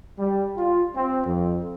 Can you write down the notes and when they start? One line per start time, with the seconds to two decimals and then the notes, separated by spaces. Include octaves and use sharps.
0.19 G3
0.56 F4
0.95 C4
1.25 F2